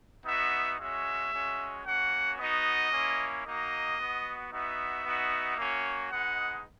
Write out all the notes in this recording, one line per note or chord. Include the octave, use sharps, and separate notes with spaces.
B3 D#4 F#4 E5
G#3 C#4 F#4 E5
G#3 C#4 F#4
A#3 C#4 F#4 F#5
B3 D#4 F#4 D#5
A#3 C#4 E4
A#3 D#4 F#4 D#5
B3 F#4
B3 D#4 F#4 E5
B3 D#4 F#4
A#3 C#4 F#4
G#3 B3 D#4 F#5